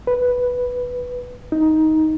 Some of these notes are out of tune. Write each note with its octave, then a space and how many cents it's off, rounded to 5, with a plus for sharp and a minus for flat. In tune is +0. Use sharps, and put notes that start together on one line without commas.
B4 +0
D#4 +10